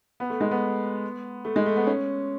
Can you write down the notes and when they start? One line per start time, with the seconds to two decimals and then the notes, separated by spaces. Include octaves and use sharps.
0.20 B3
0.30 A3
0.41 G#3
0.51 B3
1.45 A3
1.56 G#3
1.66 A3
1.76 B3
1.87 C#4